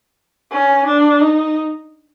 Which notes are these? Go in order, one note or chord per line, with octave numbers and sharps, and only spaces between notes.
C#4
D4
D#4